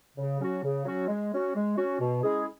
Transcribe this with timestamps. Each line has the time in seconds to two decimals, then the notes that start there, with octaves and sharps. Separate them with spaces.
0.17 C#3
0.39 F#3 C#4 F#4
0.63 C#3
0.85 F#3 C#4 F#4
1.08 G#3
1.32 C#4 F#4
1.55 G#3
1.77 C#4 F#4
2.00 B2
2.23 G#3 C#4 E4 G#4